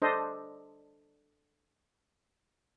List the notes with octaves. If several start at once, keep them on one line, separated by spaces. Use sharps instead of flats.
D4 A4 C5 D#5